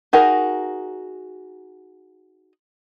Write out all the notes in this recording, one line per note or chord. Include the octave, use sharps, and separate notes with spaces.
D#4 F#4 G#4 A#4